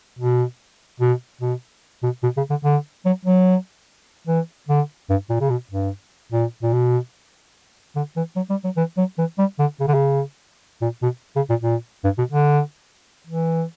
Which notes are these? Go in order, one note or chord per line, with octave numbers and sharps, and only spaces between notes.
B2
B2
B2
B2
B2
C#3
D3
D3
F#3
F#3
E3
D3
G2
A#2
C#3
B2
G2
A#2
A#2
B2
D3
E3
F#3
G3
F#3
E3
F#3
E3
G3
D3
C#3
D3
C#3
A#2
B2
C#3
A#2
A#2
G2
B2
D3
E3